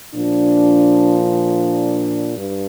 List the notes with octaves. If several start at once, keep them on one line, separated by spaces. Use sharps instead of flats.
A#2 F3 D4
D4
G2